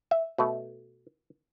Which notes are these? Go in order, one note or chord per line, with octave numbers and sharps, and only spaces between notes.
E5
B2 A3